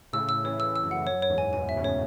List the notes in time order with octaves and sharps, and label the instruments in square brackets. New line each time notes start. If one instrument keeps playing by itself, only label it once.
[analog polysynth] A2 C#3 [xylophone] E6
[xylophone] E6
[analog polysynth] C#3 E3 [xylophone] C#5
[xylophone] E6
E6
[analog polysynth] F#2
[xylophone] F#5
[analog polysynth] F#2 [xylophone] C#5
[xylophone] C#5
[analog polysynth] E2 G#2
[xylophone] G#5
[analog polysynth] G#2 B2 [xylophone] G#5
[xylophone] E5
[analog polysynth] A2 C#3
[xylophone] C#5